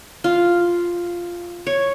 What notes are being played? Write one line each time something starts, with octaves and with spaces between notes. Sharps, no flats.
F4
C#5